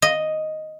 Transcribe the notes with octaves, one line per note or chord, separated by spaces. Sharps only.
D#5